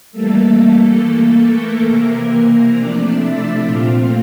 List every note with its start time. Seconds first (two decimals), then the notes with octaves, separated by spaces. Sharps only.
0.12 E3 G3 A3 A#3 A4
1.00 E3 A#3
1.44 A#3 A#4
1.88 C3 E3 A#3
2.76 C3 F3 A3 D4 D5
3.20 E4 E5
3.64 A#2 A3 C4 F4 F5